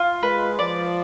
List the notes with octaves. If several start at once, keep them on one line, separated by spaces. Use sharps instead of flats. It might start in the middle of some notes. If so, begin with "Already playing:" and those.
Already playing: F4
G#3 B4
F3 D5